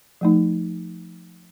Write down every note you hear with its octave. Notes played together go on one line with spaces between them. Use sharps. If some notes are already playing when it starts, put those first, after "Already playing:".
F3 A3 D#4